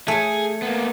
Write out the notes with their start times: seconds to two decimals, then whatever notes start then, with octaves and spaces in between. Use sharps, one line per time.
0.08 A3 G#4 G#5
0.62 A#3 B3